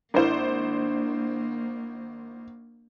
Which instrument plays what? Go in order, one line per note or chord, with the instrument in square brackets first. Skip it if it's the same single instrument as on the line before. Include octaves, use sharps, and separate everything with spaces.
[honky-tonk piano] G#1 C5 [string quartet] A#3 [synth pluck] D4 [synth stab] E4 A#4